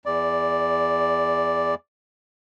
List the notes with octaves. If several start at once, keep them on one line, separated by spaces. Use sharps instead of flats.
E2 D5